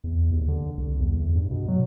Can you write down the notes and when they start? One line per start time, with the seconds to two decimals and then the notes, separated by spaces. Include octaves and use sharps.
0.04 E2
0.31 D#2
0.48 D3
0.77 C2
0.99 E2
1.14 E2
1.35 G2
1.51 B2
1.68 F#3